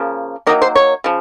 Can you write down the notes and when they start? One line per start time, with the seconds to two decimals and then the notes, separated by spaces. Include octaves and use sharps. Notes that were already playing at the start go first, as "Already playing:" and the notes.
Already playing: C#3 F3 A#3
0.47 D#3 F#3 A#3 D#4
0.62 C5
0.75 C#5
1.04 C#3 F3